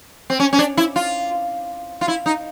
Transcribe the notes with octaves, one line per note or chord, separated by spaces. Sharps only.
C4
C#4
C#4
D4
E4
F4
F4
E4
D#4